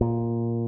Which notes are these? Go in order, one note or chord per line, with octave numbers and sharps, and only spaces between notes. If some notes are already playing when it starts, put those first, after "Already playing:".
A#2